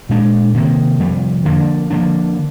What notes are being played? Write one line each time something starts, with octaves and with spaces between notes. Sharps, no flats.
A#2 G#3 D4
C3 D#3 A#3
F2 C3 G3
D3 F3 A#3 D4
D3 F3 A#3 D4